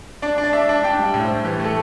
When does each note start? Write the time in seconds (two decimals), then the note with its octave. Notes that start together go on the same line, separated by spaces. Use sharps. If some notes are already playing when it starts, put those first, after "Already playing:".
0.22 D4 D5
0.38 D4
0.43 D5
0.53 D4 E5
0.69 D4
0.83 D4 G5
0.99 G3
1.05 G5
1.14 A2
1.25 C5
1.29 A2
1.44 E3 G4
1.60 A3 A4